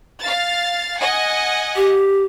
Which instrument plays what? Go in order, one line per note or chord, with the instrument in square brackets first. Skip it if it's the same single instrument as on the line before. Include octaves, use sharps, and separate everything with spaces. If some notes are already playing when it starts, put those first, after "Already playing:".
[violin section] F5 A6
D#5 F#5 G#5
[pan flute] G4